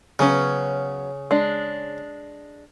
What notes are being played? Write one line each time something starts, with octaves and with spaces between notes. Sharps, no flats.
C#3 F#3 B3 C#4
G#3 D4